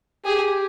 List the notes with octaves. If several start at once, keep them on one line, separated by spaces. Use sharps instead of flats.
G4 G#4